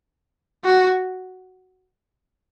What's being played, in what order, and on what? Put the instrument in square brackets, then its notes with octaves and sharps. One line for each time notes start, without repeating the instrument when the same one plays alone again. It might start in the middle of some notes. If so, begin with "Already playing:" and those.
[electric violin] F#4